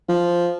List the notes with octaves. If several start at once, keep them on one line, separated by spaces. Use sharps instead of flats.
F3